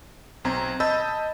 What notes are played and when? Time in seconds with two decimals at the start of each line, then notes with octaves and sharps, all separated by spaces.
0.45 B1 C4 A#5 G#6
0.80 D#5 A5 B5 E6 G6 A6